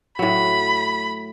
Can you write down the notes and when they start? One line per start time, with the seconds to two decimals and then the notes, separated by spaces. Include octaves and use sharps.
0.19 A2 F#3 B5